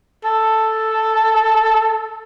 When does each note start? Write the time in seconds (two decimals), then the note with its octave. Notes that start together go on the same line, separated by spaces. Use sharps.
0.24 A4